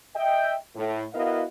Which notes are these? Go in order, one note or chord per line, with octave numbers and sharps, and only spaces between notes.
D#5 E5 G5
A2
B3 E4 F#4 A#4 D#5 F5